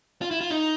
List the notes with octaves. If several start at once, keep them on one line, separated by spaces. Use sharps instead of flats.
F4
E4
F4
D#4